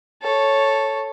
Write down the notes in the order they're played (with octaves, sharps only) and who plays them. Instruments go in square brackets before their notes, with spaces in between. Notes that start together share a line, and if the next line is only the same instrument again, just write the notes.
[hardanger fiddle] A4 C#5